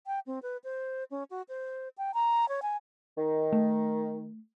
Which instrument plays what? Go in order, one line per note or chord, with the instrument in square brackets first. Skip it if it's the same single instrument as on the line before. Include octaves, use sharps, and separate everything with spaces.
[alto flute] G5
C4
B4
C5
C#4
F#4
C5
G5
A#5
C#5
G#5
[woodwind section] D#3
[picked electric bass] A3